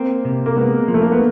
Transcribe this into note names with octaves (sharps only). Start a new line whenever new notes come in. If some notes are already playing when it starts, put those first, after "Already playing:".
Already playing: A#3 C4
C3
A#3
G#3 B3
F3
A3
A#3
B3